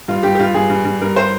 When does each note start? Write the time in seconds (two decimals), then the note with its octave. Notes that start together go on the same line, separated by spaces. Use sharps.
0.08 G2 F4
0.23 G2 G4
0.35 G4
0.39 G2 F4
0.54 G2 G#4
0.70 G2
0.85 G2
1.01 G2 A#4
1.16 C5